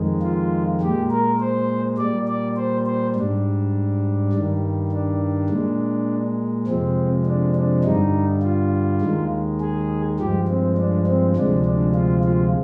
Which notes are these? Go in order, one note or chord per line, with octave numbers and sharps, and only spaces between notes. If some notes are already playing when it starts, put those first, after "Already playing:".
Already playing: F2 D#3 G#3
F4
A#2 G#3 G4
A#4
C5
A#2 G3 D5
D5
C5
C5
G#2 G3 D4
G2 D#3 G3
D4
A#2 G#3
F2 C3 F3 G#3 C4
D4
D4
G2 D3 G3 D#4
F4
D#2 D#3 G#3
G#4
G2 F3 G#3 G4
C4
D4
C4
D2 C3 F3 G#3 D4
D4
F4
F4